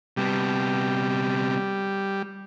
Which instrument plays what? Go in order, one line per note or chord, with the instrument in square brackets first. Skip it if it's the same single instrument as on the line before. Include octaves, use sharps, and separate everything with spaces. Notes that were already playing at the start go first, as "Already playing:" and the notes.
[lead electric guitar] C3 B3 [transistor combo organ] G3